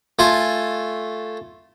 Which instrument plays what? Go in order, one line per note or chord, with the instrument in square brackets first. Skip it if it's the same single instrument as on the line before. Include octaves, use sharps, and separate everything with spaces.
[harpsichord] A3 F4 G#5